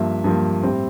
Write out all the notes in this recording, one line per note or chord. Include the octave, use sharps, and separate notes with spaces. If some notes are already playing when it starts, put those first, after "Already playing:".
Already playing: G2 F3 A#3 E5
G2 F3 A#3
A2 G3 C4